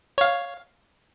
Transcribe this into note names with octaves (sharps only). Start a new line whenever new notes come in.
C#5 F5